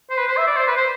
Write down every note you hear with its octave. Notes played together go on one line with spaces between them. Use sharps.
C5
B4
C5
E5
D5
C5
B4
C5